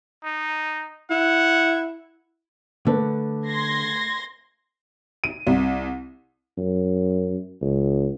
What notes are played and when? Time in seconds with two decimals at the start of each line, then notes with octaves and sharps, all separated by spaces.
0.24 D#4
1.11 E4 F#5
2.87 D3 A3 B4
3.48 C6 G#6 A#6
5.24 D#7
5.47 C2
6.58 F#2
7.62 C#2